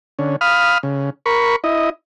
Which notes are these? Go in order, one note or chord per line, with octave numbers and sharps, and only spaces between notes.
D3 C#4
F5 B5 D#6 F6
C#3
A#4 B5 C#6
E4 D#5